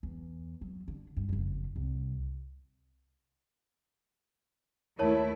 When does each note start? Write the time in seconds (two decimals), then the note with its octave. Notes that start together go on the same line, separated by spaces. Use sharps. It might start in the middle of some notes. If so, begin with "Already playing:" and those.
0.03 E2
0.61 F#3
0.88 D3
1.17 G2
1.29 F#1 F2
1.76 C2
4.99 D#2 A3 E4 A#4 C#5 A5